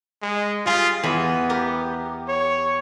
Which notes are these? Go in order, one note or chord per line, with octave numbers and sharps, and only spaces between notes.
G#3
G3 F4 G#4
E2 B3 G#5 B5
G4 A#4
C#5